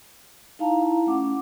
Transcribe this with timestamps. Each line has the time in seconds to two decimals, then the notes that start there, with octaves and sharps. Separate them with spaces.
0.59 D#4 E4 F5 A5 A#5
0.82 E4
1.06 A3 C#4 F#5 D6